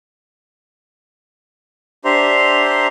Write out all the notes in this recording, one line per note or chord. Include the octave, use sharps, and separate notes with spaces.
D4 G4 C5 E5 A#5 C6